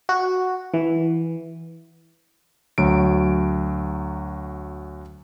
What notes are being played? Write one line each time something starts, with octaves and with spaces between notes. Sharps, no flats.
F#4
E3
D2 F#3 D7